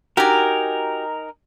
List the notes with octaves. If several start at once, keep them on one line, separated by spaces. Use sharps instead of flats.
D#4 F#4 G4 A#4 G#5